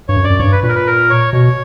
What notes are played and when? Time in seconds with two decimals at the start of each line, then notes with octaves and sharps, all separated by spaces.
0.09 G2 C#5
0.17 F#2
0.24 D5
0.30 F#2
0.39 G2 C#5
0.52 B4
0.63 A#2 B4
0.69 A#4
0.75 B4
0.87 A#4
1.10 C#5
1.33 B2 C#5